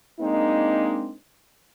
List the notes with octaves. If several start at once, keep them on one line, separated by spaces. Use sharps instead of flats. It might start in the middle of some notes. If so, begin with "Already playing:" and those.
G#3 A#3 C4 D4 D#4